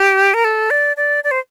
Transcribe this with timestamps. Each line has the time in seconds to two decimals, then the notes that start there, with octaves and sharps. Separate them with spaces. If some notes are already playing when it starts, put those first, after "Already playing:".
Already playing: G4
0.34 A#4
0.44 A4
0.70 D5
0.97 D5
1.24 D5
1.31 C5